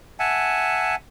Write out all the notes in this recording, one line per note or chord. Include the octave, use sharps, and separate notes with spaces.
E5 F#5 G#5 A5